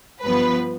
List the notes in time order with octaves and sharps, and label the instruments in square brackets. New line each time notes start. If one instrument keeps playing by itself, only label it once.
[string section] G2 F3 B3 B4